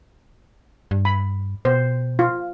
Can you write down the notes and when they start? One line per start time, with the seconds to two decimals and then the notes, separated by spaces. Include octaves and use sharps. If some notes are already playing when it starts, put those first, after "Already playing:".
0.91 G2
1.05 B5
1.65 B2 C5
2.19 F4